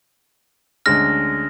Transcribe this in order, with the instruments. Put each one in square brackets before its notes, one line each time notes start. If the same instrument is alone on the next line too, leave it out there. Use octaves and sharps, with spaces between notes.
[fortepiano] D2 G#3 C#4 [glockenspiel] F6 A#6